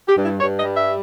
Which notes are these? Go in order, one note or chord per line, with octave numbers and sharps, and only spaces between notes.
G4
G2
E4
G2 C#5
D#5
G3
E5